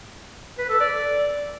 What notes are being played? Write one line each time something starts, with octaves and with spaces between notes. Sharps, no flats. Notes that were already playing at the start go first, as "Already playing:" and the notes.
B4
A4
D5